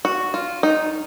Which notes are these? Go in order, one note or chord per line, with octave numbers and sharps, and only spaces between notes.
F#4
F4
D#4